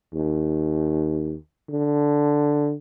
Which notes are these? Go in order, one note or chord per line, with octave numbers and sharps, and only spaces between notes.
D#2
D3